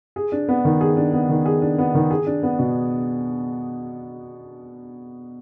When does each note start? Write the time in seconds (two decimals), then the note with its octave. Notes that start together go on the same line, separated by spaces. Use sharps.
0.16 G#4
0.32 D4
0.48 B3
0.65 D#3
0.81 G#4
0.97 D4
1.13 B3
1.29 D#3
1.45 G#4
1.62 D4
1.78 B3
1.95 D#3
2.10 G#4
2.27 D4
2.43 B3
2.59 B2